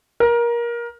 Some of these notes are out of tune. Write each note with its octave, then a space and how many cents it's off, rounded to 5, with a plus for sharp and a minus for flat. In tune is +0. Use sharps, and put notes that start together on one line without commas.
A#4 +20